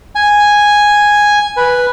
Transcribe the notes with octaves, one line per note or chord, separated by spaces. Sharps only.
G#5
B4